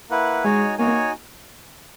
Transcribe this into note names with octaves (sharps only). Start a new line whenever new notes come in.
A#3 E4 B4 F#5
G#3 D#4 F#4 C#5 G#5
A#3 D#4 F#4 C#5 G#5